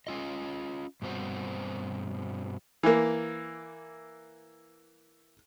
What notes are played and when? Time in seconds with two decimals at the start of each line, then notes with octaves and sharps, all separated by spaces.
0.07 C#4 F4 D#5
1.02 G2 B2 C4 F#4 C5
2.83 E3 A#3